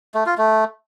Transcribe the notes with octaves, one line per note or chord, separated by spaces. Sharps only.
A3
F4
A3